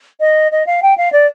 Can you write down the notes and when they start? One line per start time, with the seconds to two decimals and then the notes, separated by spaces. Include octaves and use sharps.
0.20 D#5
0.52 D#5
0.66 F5
0.82 G5
0.97 F5
1.12 D5